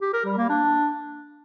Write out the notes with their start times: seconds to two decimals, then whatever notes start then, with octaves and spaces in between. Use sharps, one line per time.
0.02 G4
0.13 A#4
0.25 G3
0.37 A#3
0.49 D4